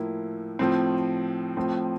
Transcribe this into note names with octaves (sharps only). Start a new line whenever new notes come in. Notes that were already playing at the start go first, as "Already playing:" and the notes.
Already playing: A2 F3 A#3 E4
A2 F3 C4
A2 F3 C4